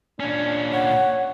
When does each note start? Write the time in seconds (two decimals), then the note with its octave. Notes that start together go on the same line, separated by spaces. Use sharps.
0.20 A#2 C#4 D4
0.73 C#5 F#5